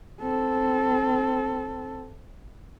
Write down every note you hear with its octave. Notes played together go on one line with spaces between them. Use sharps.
C4 A4